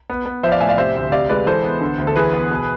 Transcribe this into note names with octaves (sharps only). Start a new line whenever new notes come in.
B3
B3
F3 C5 E5
D5 F5
A2 E5 G#5
D5 F5
C3 C5 E5
D2
C3 D5 F5
G#3 B4 D5
E3 A4 C5
B3
D3
D2
A4
E3 G#4 B4
B3
B2